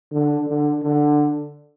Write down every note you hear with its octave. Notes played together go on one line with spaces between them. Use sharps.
D3
D3
D3